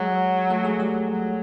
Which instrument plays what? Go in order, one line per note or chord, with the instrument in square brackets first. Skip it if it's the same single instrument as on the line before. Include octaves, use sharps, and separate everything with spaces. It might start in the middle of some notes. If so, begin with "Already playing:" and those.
Already playing: [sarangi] F#3 [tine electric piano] G#3 G#4
[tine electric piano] A3 A4
G#3 G#4
G3 G4
[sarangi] F#3